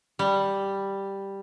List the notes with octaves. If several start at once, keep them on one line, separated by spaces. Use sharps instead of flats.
G3